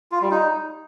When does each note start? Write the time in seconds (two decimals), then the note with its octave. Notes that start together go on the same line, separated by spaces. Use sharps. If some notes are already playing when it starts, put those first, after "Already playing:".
0.12 F4
0.21 G3
0.31 D#4